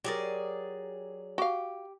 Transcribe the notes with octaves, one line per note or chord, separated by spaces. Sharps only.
F#3 G4 G#4 A#4 D5
F#4 G4 F5